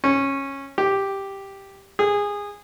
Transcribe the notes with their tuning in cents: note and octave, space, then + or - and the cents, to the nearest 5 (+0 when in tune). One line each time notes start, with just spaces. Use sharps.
C#4 -15
G4 +0
G#4 -20